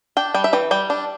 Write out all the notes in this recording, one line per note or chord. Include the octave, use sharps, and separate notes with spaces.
D4 G5
G3 G5
E5
E3 G5
G3 G5
D4